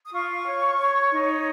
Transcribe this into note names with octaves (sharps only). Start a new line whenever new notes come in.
D#6
F4 C#6
C#5
C#5
D#4